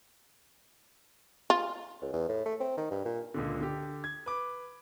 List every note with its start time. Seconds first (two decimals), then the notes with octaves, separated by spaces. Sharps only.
1.50 F4
2.02 C#2
2.13 E2
2.29 A2
2.46 A3
2.60 C4
2.77 D#3
2.91 G2
3.05 A#2
3.34 C#2 A#2 D3
3.61 D3 G4
4.04 G#6
4.26 B4 D6